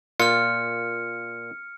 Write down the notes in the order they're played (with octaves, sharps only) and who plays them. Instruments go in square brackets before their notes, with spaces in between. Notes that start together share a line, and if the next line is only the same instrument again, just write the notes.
[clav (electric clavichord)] A#2 F4 [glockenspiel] F6 C#7